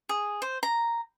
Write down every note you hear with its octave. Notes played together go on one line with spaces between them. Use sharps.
G#4
C5
A#5